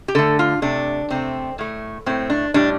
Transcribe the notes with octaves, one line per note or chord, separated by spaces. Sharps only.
G4
D3 A3 A4
F4
C3 A3 D4
C3 A3 C4
A2 A3
A2 A3 C4
D4
A2 G3 D4